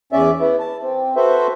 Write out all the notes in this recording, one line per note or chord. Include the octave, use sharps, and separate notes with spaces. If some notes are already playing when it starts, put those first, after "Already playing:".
E2 C#4 D5 E5
B3 E4
A5
C4
F#4 A4 B4 C5 E5